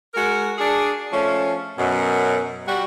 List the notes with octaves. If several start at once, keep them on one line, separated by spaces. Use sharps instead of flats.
G#3 F#4 A#4
D4 G#4
F3 A3 C#4
F#2 B2
G3 F#4